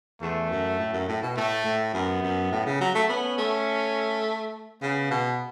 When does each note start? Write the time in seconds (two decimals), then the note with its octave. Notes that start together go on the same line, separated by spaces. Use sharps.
0.21 E2 A3
0.50 F#2
0.79 A2
0.93 F#2
1.08 A2
1.22 B2
1.36 A2 A3
1.65 A2
1.93 F#2 B3
2.22 F#2
2.52 A2
2.66 C#3
2.81 F#3
2.95 A3
3.09 B3 C#4
3.38 A3
4.82 C#3 B3
5.10 B2